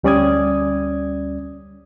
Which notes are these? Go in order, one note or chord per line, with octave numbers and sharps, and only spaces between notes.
D2 G3 C#4 D5 D#6 G#6